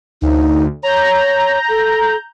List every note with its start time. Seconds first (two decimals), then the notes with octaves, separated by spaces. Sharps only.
0.22 D2 D#4
0.83 C#5 A#5 G6
1.69 A4